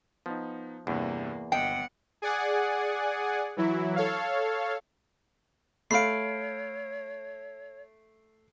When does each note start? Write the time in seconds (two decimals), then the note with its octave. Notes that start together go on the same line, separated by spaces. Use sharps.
0.26 F3 B3 D#4
0.87 E2 G2 C3 A#3
1.52 G1 B3 D#5 F#5 G5 C7
2.22 G#4 D5 F#5 G#5
3.57 E3 F#3 E4
3.96 A4 C#5 F5
5.91 A3 C#5 F5 B5 C6 C7 D7